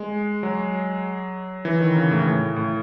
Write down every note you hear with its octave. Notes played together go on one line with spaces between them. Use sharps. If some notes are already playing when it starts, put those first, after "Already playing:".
Already playing: G#3
F#3
E3
D#3
C#3
A2
A2
A2